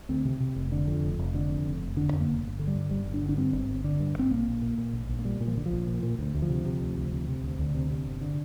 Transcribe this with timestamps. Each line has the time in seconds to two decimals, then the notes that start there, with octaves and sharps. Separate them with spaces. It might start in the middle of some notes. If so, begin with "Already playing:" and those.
0.09 D2 C4
0.25 C3
0.40 C3
0.56 F1
0.72 D3
0.87 F2
1.03 F1
1.19 F1
1.34 D3
1.50 F2
1.65 F1
1.81 F1
1.97 D3 D4
2.13 F2
2.20 A#3
2.28 F1
2.43 G1
2.59 D3
2.67 G3
2.75 G2
2.91 G1 G3
3.06 G1
3.14 D4
3.22 D3
3.29 D4
3.37 G2 C4
3.53 G1
3.69 G1
3.84 D3
4.00 G2
4.15 G1 C4
4.31 A#1 A#3
4.47 A#1
4.62 A#2
4.78 A#2
4.93 A#1
5.09 A#1
5.19 A#3
5.24 A#2 G3
5.40 A#2
5.48 F3
5.56 A#1 D3
5.66 F3
5.72 A#1
5.87 A#2
6.03 A#2
6.19 D2
6.34 D2
6.42 F3
6.50 C3
6.65 C3
6.81 D2
6.97 D2
7.12 C3
7.28 C3
7.43 D2
7.59 D2 D3
7.75 C3
7.91 C3
8.06 G1
8.21 D3